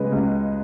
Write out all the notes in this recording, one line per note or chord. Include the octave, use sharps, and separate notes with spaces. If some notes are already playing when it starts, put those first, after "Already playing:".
Already playing: C#3 G#3 B4 D#5
C#2